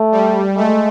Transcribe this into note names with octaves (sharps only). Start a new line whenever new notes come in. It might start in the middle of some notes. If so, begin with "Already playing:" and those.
Already playing: A3
G3
G#3 A3